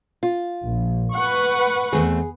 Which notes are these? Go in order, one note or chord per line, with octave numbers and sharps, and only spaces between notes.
F4
A#1
B4 F#5 C#6
E2 A3 C4 G#4